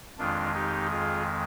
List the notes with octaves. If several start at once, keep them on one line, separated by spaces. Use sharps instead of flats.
F2 D#3 G#3 D4 F4
D#4 G4
F4 G#4